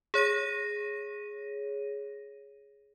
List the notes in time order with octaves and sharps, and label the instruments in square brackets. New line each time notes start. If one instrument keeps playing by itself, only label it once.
[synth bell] G#4 C#5 A#6 D#7